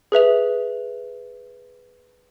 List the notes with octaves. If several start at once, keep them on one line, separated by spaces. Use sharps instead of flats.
G#4 B4 E5 F7